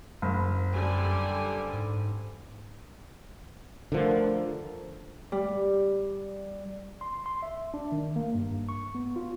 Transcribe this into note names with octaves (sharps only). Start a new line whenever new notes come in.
F#1 F#2
D3 G3 G#5
G#2
D3 F3 A3 A#4
G3
C6
C6
E5
D4
D#3
A#3
G2
C#6
B3
F4